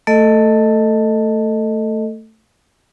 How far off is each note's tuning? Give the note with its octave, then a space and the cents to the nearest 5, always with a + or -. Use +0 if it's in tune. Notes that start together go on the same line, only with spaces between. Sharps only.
A3 +10 A4 +10 D#5 +0